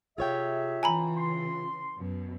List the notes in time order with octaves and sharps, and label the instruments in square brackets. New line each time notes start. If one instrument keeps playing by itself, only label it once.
[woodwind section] C3 G#4 E5 [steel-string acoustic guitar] F4 C#5 G5
[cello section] C#3 E3 [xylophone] G#5 A#5 B5
[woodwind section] C6
[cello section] F#2 B2